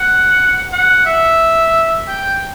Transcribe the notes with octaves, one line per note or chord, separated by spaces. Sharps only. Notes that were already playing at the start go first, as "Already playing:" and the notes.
Already playing: F#5
F#5
E5
G5